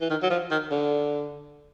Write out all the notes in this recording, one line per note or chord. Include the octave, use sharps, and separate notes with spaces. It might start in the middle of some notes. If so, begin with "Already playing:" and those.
E3
D#3
F#3
F3
D#3
D3